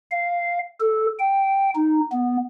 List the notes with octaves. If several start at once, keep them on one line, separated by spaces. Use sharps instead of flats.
F5
A4
G5
D#4
B3